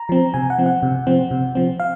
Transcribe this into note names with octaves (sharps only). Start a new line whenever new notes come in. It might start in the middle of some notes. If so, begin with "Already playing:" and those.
Already playing: A#5
F3 C4
C3 G#5
F#5
F3 C4
F#5
C3
F3 C4
C3
F3 C4
F5